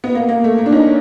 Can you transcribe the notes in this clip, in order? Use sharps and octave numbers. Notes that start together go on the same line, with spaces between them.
B3
A#3
A#3
A3
A#3
D4
C#4 D#4